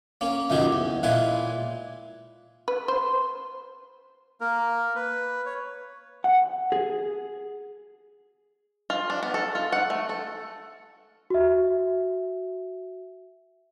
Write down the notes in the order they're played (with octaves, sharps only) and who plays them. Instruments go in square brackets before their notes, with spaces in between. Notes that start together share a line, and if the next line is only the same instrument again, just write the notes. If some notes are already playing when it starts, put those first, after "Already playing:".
[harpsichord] A#3 C#4
C#2 F#2 D#3 D#4 G4 G#4
E2
A#2 G#3 E4 F4 B4 G#5
[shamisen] B4
C5
[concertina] A#3 A#4
B4
C#5
[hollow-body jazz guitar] F#5
G#4
[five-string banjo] F4
D4
B3
A4
F4
F#5
A3
A4
[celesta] F#4 E5